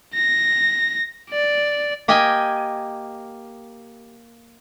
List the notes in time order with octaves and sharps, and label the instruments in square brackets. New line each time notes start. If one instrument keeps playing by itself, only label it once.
[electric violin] A#6
D5
[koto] A#3 G4 D#5 G5 G#5